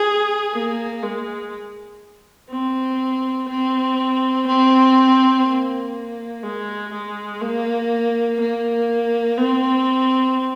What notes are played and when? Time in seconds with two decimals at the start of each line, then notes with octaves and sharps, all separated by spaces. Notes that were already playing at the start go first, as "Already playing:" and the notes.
Already playing: G#4
0.54 A#3
1.02 G#3
2.50 C4
3.48 C4
4.47 C4
5.45 A#3
6.43 G#3
6.93 G#3
7.41 A#3
8.40 A#3
9.38 C4